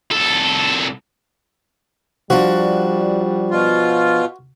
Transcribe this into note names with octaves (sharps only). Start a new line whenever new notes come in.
C2 A4
F3 G3 D4 F#4
B2 F4